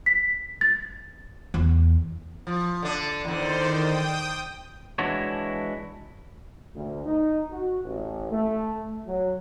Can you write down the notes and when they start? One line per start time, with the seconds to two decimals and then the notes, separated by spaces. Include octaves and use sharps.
0.06 B6
0.61 A6
1.54 E2
2.47 F3
2.83 D3 D4
3.25 E2 D3 D#3 C5 D5
3.68 G5 D#6
4.98 E3 G#3 D4 E4 F#4 C#5
6.75 D2
7.05 D#4
7.51 F#4
7.84 A1
8.31 A3
9.07 F#3